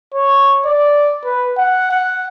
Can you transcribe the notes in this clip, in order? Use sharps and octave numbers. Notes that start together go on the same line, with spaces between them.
C#5
D5
B4
F#5
F#5